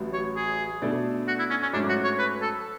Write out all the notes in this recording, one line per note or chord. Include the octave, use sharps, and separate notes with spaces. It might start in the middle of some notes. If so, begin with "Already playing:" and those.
Already playing: A1 A2 F#3
C#5
G#4
B2 A3 D4 A4
F#4
E4
C#4
C#4
G#2 F#3 A3 C#4 D4
F#4
C#5
B4
A4